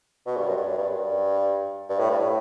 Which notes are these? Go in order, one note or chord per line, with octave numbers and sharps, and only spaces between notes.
B2
G2
F#2
G2
F#2
G2
F#2
G2
G2
A2
G2
A2